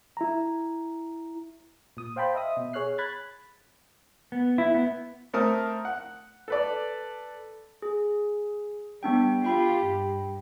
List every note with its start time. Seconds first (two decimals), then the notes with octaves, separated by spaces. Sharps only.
0.17 E4 A#5
1.97 A#2 D#6
2.16 C5 F5 G5 A5 B5 C6
2.34 D#5 E5 D#6
2.57 B2
2.73 G#4 C#5 F6 F#6 C7
2.98 B5 F#6 G#6 A6
4.32 B3
4.58 E4
4.74 B3
5.33 A3 C4 A#4 A5 D#6 F6
5.85 F#5
6.48 A4 B4 D5
7.82 G#4
9.03 G3 B3 D4 G5
9.45 F4 G4 G5 B5
9.84 G2